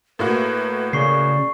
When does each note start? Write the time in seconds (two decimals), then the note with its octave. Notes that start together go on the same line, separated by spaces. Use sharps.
0.19 A2 A#3 F#4 B4
0.93 C#3 D5 C#6 C7